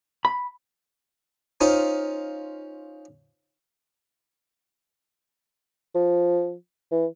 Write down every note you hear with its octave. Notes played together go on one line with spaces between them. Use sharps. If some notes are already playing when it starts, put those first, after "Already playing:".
B5
C#4 D#4 F4 C5 F5
F3
E3